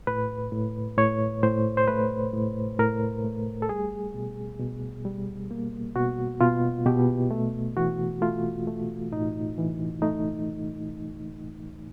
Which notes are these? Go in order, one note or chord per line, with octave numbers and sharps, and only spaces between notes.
A2 B4
A2
A2 C#5
A2 C5
C5
A3 B4
A2
A2 A#4
A3
A4
G3 G#4
B2
B2
G3
A#3
B2 F#4
B2 F4
B2 G4
A3
E3 F#4
A3 F4
A3
A2 D#4
E3
A3 D#4